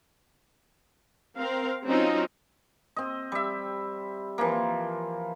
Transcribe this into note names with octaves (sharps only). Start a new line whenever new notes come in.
C4 A#4 F5
F#3 C4 C#4 D#4 F4
C4 D#5
G3 E5
E3 F3 A#3